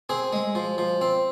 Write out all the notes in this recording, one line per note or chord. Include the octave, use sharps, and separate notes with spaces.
C4 G#4
G#3
F3
F3
C4